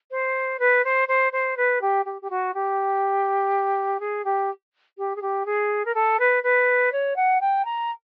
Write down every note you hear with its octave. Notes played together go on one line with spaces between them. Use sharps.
C5
B4
C5
C5
C5
B4
G4
G4
G4
F#4
G4
G#4
G4
G4
G#4
G4
G#4
A#4
A4
B4
B4
C#5
F#5
G5
A#5